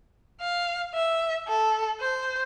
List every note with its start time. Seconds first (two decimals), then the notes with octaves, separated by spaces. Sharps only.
0.40 F5
0.94 E5
1.47 A4
2.01 C5